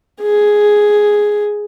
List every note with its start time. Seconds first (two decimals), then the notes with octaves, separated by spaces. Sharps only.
0.22 G#4